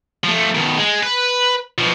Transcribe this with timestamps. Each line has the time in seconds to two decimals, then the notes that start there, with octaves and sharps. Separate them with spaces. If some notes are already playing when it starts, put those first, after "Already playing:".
0.24 F3 A3
0.55 B2 D#3
0.79 G#3
1.03 B4
1.78 B2 F3